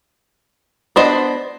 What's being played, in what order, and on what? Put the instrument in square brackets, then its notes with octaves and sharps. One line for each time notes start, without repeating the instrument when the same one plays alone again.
[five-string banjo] B3 D4 C5 D#5